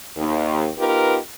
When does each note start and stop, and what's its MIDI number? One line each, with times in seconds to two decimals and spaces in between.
0.17 0.69 39
0.79 1.18 59
0.79 1.18 63
0.79 1.18 65
0.79 1.18 67
0.79 1.18 70
0.79 1.18 71